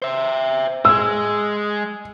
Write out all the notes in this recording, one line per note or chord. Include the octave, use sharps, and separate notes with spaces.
C5 E5
G#3 G#4 E6